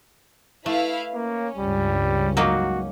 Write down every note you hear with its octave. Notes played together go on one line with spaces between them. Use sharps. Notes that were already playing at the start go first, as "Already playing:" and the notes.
A3 E4 B4 F5
A#3 C#4
C#2 G2 G3
F#3 A#3 D#4 F#4